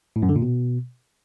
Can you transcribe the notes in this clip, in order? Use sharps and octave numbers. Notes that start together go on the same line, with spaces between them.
A2
F#2
D3
A#2
B2